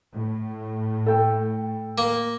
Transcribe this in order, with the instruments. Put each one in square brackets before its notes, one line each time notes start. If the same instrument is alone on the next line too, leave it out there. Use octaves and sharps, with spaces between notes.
[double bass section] A2
[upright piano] A4 G5
[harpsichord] A#3